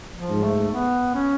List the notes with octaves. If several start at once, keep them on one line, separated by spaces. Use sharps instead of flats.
F3
G#2
A3
B3
C#4